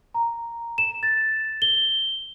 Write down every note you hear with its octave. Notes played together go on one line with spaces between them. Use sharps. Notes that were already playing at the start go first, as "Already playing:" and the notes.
A#5
E7
A6
G7